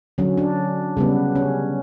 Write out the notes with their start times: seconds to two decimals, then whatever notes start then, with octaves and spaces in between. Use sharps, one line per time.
0.18 D3 F#3 C#4
0.38 D4
0.97 C#3 G3 B3
1.35 C#4